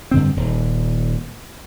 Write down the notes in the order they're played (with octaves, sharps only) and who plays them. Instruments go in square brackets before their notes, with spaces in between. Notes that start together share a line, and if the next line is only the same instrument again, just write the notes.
[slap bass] G2 D3 C4
D#1